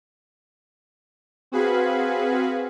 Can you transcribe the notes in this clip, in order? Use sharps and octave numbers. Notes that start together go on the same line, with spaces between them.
C4 F#4 G#4 B4 F5 B5